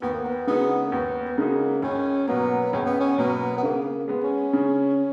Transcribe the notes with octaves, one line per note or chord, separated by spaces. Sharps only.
D#2 B3
A#3
B3
C#3 G#3 B3 D#4 F#4
A#3
D#2 B3
B3
C#3 G#3 A#3 D#4 F#4
C#2 C#4
B2 F#3 A#3 B3
C#2 C#4
B3
C#4
B2 F#3 A#3 B3
B3
C#3 A#3
G#3 B3
C#4
C#3